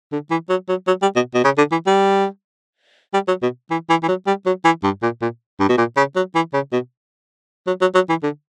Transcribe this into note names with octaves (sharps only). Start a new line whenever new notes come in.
D3
E3
F#3
F#3
F#3
G3
B2
B2
C#3
D3
E3
G3
G3
F#3
B2
E3
E3
E3
F#3
G3
F#3
E3
G2
A#2
A#2
G2
B2
A#2
C#3
F#3
E3
C#3
B2
F#3
F#3
F#3
E3
D3